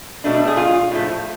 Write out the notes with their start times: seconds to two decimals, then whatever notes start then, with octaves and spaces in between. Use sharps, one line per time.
0.24 B2 A3 D4
0.47 G#4
0.57 F4
0.91 A2 F3 A3